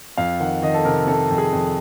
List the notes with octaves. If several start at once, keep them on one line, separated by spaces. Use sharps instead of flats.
F2 F5
D#3 F#5
D#3 D#5
A4
C3 A#4
C3 A4
F2
G#4
F2